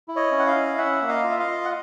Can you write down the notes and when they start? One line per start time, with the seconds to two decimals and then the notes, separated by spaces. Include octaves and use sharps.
0.08 E4
0.16 C#5 D#5
0.31 C#4
0.39 F#5
0.47 D#5 F5
0.55 E4
0.78 C#4 E5 F#5
1.02 A#3
1.08 D#5 F5
1.24 F4
1.31 E5
1.39 D#5 F5
1.48 F4
1.65 F#5